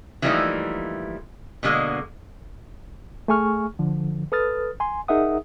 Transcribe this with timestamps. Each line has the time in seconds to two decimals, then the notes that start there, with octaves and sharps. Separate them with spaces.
0.22 E3 F3 G3 A3 A#3 D#4
1.63 B2 D3 G#3 A#3
3.28 A3 G#4 G#5 C#6 F6
3.79 D3 F3
4.32 A4 B4 D#6 F6 A6
4.80 G#5 C6
5.08 D#4 G#4 A#4 E5 F#5 D#6